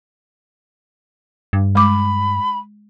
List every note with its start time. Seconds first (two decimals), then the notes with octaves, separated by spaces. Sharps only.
1.53 G2
1.75 G#3 B5 D6